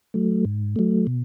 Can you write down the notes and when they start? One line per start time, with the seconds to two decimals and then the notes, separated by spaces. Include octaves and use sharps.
0.14 F#3 A3
0.45 G#2
0.76 F#3 A3
1.07 B2